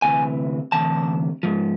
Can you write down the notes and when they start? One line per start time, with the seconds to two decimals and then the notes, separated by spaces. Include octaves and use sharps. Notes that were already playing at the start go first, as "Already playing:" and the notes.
0.02 D2 C3 E3 G#5
0.72 D2 C3 E3 A5
1.43 G#2 F3